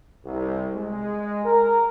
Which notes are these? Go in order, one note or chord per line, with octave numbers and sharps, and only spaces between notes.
C2
G#3
A#4